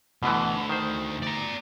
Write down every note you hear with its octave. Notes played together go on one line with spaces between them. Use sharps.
D2 B2 D3 E3 A3
D#3 C5
D5 A#5